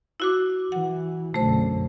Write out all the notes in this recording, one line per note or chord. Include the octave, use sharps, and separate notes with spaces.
E4 F#4 D6
E3 F#5
B1 F#2 D3 A3 C5